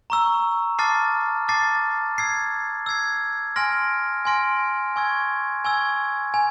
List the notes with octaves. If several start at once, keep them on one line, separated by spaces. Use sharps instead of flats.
A#5 C#6 E6
A5 D6 F6 A6 C7
A5 D6 F6 A6 C7
E6 G#6 C7
E6 G#6 C7
G#5 C6 F6 A#6 D7
G#5 C6 F6 A#6 D7
G#5 C#6 E6 G#6
G#5 C#6 E6 G#6
G#5